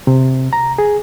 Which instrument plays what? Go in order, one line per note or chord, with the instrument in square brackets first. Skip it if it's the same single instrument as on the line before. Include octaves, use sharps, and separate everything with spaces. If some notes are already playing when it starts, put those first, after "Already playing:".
[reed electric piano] C3
A#5
G#4